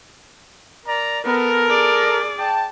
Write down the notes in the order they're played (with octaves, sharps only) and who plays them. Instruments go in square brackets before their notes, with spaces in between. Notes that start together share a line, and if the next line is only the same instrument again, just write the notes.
[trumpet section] A#4 D5 A#5
[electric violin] B3 [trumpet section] A4 A#4
[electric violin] G#4 D5
[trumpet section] G5 A5